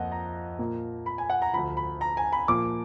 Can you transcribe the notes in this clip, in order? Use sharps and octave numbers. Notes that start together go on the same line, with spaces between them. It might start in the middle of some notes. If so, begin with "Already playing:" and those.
Already playing: F2 F3 A#3 D#5 F#5
A#5
A#2 F3 A#3
B5
G#5
F#5
A#5
D2 D3 F3 B5
B5
A#5
G#5
B5
A#2 F3 A#3 D6